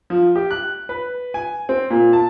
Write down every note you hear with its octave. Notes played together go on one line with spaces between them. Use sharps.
F3
G4
F#6
B4
G#5
C4
A#2
A5